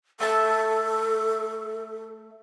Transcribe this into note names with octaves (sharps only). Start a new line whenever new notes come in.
A3 A4 E5 A5